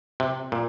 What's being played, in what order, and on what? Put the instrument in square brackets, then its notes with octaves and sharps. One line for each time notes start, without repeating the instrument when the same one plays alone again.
[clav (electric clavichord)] C3
A#2